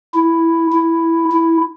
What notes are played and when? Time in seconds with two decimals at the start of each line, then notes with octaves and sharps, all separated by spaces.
0.14 E4
0.72 E4
1.32 E4